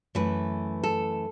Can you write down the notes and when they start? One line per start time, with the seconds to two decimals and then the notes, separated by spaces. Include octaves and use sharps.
0.15 F#2 E3 A3 B4
0.84 A4